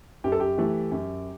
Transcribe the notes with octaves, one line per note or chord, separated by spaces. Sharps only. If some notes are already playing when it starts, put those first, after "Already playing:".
F#2 G4
A4
G4
E3 A3
F#2